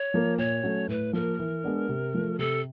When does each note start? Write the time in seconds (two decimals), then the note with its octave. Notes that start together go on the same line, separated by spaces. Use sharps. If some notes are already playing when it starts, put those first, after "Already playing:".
Already playing: C#5
0.14 F3 A#3
0.38 A#2 C#5
0.63 F#3 A3 C#4
0.88 A2 B4
1.13 F3 A#3 A#4
1.39 E3
1.64 G#3 B3 D4
1.89 C3
2.14 F3 A3
2.39 C3 A4